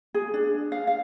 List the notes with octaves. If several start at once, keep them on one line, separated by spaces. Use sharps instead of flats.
G#4
D4
F5
F5